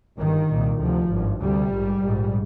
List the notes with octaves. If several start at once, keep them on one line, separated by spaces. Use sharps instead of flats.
G1 G2 D#3
C2 A#2
D2 C3 F3
G#1 G2
D2 C3 G3
A#1 G#2
A#1 G#2